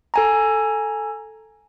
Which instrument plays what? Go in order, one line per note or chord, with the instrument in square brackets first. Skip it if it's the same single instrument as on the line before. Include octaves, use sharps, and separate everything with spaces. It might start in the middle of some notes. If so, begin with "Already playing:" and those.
[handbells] A4 G#5 A#5